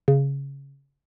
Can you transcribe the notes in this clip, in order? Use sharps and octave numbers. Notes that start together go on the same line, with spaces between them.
C#3